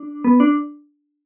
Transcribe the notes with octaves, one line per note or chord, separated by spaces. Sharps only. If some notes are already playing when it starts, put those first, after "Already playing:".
Already playing: D4
B3
D4